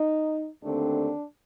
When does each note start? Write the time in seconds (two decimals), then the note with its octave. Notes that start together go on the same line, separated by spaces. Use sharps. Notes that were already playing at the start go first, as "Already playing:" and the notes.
Already playing: D#4
0.61 D#2 D3 A3 C4 D4